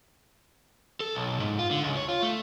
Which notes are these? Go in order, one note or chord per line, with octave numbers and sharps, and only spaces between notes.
A4
B1
G#2
F4
D3
C#2
C#5
F4
A3